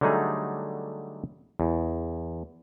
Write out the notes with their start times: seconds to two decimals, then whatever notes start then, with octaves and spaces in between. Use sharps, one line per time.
0.01 D3 F#3 G3 A3 D#4 G#4
1.60 E2